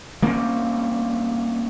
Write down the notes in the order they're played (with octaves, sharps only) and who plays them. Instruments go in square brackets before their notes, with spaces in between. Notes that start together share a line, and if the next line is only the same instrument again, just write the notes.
[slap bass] G3 A#3 C4 C#4